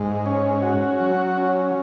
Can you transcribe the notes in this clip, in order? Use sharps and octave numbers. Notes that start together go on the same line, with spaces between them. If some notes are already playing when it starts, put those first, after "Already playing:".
Already playing: G#2
C#4
F#4
F#3
C#4